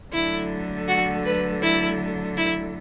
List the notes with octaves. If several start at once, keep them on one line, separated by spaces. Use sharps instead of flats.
D3 F#3 A3 E4
F#4
B4
E4
E4